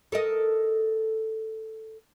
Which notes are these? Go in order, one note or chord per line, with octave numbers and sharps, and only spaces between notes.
A4 A#4 D#5